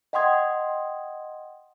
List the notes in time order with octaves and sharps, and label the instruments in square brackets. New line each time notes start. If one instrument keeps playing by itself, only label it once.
[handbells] D#5 F#5 G5 C6 D#6 G#6